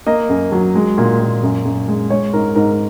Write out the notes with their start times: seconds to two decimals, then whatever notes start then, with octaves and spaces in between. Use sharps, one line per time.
0.06 A#3 D#5
0.29 F#2
0.52 F#3
0.75 G#3
0.98 A#2
1.20 A#2
1.43 F#2
1.65 F#2
1.88 G#3
2.10 G#3 C#5
2.33 G#2 A#4
2.55 G#2 A#4